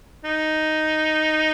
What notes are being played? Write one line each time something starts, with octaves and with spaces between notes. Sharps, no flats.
D#4